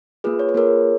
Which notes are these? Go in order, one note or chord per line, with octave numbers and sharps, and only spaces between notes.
A#3 F4 G#4 B4
C#5
B4
A#3 F4 G#4 A#4 C#5